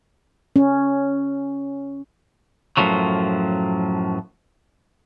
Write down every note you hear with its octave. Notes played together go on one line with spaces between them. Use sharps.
C#4
F#2 A2 F3 F#3